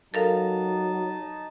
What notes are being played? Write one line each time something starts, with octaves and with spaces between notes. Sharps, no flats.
F#3 D#4 A4 A#4 F5 A5